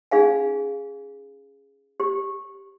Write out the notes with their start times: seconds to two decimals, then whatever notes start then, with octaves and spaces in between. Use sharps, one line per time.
0.11 C#4 D#4 G#4 F5 G#5
2.00 G4